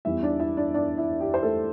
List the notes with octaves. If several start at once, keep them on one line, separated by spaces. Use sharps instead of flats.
E2 E3 G3 E4 E5
D4 D5
E4 E5
D4 D5
D4 D5
E4
G4
C5
A3 A4